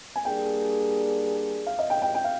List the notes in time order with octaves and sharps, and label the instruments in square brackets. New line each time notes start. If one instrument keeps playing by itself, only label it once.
[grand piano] G#5
[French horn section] G3 A#3 D4 G#4 [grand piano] G5
[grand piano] F5
D#5
G5
G5
G5
F5